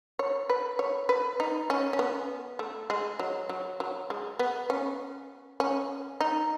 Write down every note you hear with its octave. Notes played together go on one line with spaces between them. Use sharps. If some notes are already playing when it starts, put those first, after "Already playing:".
C#5
B4
C#5
B4
D#4
C#4
C#4
B3
A3
G#3
F#3
F#3
F#3
G#3
B3
C#4
C#4
D#4